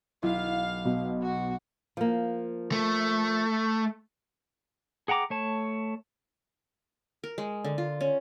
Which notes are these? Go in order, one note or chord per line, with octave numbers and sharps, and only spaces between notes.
B1 E4 F5
B2
F#4
F3 A#3
A3
G#4 F#5 G5 A#5 D6
A3 C#5 A5
A#4
G#3
D3
F4
C#4